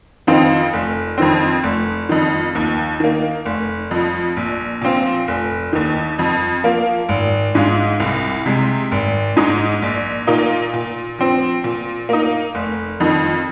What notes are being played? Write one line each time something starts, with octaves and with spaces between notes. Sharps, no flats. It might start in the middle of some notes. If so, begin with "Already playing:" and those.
F2 D#3 C4 F4
F1
F2 D#3 C4
F1
F2 D#3
D#2
D#3 A#3
F1
F2 F3
A#1
A#2 F3 C4 F4
F1
D#2 D#3
F2
F3 A#3 F4
G#1
G#2 G#3 F4
C2
C3 G#3
G#1
G#2 G#3 D#4
A#1
A#2 A#3 D#4
A#2
F3 C4
A#2
A#3 D#4
F1
F2 D#3